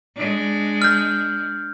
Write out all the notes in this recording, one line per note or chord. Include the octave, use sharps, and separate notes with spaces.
G#3 D4
F6 G6